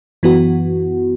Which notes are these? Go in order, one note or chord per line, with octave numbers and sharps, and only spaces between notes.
F#2 E3 B3 F#4